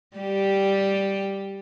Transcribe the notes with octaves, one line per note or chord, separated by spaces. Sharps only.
G3 G4